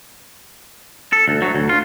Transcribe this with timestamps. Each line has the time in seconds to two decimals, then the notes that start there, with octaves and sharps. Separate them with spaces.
1.13 A4
1.28 D2
1.42 F#3
1.55 D2
1.69 F4